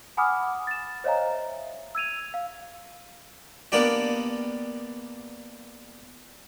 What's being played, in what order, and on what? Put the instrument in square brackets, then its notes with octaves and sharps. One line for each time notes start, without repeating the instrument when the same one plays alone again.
[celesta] F#5 G#5 B5 D6 D#6 F6
A6 E7
C5 C#5 D#5 F5 G#5 A#5
E5
E6 G#6 D#7 F7
F5
[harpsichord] A#3 B3 D4 G4 D5